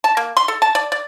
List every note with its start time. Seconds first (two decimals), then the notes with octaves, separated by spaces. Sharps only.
0.04 A5
0.17 A#3
0.37 C6
0.48 A4
0.62 A5
0.75 D5
0.92 D5